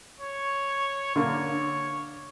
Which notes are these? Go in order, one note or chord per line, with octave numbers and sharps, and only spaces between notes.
C#5
D3 A#3 C#5